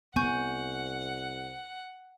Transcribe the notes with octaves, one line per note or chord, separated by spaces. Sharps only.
C2 B3 F#5 G#5 C#6 G6